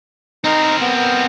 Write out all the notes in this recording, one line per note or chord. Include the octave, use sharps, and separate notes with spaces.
C4 D#4 A#4
B3
B3